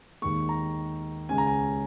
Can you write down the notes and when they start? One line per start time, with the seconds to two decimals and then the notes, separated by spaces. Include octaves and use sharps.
0.22 D#2 D#3 G#3 C#6
0.49 A#5
1.29 C#2 C#3 G#3 C#4 G#5
1.38 A#5
1.47 G#5